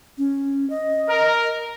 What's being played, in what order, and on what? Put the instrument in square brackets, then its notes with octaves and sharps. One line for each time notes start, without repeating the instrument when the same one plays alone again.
[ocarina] C#4
D#5
[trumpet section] A#4